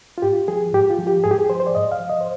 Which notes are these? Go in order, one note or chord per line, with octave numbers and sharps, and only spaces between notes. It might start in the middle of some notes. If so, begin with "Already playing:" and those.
F4
G#2 G4
F3 G#4
G#2 G4
F4
F3
G4
G#2 G#4
G4
G#4
F3 C5
C5
D5
G#2 D#5
F5
F3
D#5
C5